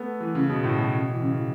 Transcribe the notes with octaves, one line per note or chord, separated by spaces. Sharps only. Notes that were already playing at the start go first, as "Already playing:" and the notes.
Already playing: A3 B3
E3
C#3
B2
A2
B2
E3
C#3
E3